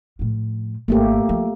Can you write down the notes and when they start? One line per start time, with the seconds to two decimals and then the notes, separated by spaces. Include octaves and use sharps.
0.19 A2 F3
0.88 G#1 A3 A#3 G4
1.29 F3